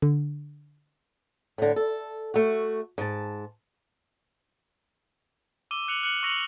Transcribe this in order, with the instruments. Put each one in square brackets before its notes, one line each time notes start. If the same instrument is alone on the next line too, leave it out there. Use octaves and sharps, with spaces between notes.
[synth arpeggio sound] D3
[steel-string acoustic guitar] A2 D3
A4
A3 F#4
G#2 A5
[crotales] D6 E6 D#7 G7
F#6 C#7 D#7 F7 F#7
F6 F#6 C#7 F#7
C#6 E6 A#6 C#7 F7 F#7